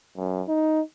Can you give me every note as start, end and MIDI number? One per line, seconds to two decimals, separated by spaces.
0.17 0.42 42
0.48 0.81 63